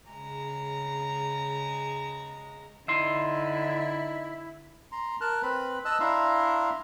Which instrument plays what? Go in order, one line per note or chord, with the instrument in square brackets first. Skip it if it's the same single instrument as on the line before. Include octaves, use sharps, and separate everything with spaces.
[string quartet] C#3 G#3 A#5
[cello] D3 [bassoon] D#4 [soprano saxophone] E4 [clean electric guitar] E5 C6
[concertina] A#5 C6
A#4 A5 F6 F#6
C4 B4 B5
D#5 A5 E6 F#6
D4 E4 E5 F5 A#5 C6